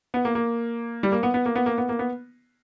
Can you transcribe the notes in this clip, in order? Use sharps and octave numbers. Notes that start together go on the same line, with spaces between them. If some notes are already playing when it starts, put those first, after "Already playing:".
B3
A#3
A#3
G3
A#3
B3
B3
A#3
B3
A#3
B3
A#3
B3